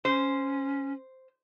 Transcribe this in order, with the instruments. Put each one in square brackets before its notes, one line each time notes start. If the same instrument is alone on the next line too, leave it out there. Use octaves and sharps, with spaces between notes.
[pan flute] C#4 [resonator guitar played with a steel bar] C5